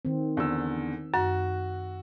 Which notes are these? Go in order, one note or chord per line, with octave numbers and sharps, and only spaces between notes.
D#3 C4
E2 D3 E6
F#2 F#4